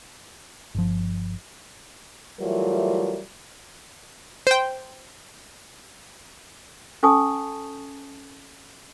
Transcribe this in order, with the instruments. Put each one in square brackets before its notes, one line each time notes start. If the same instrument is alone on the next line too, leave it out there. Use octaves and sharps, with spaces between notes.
[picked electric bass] G1 F3
[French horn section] E3 F#3 G3 A3 F4 A#4
[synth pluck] C5 G5
[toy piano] C#4 A4 G#5 A5 C#6 D#6